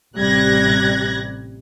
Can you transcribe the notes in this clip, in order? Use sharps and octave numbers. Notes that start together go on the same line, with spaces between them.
A1 C3 G3 F#6 G#6 A#6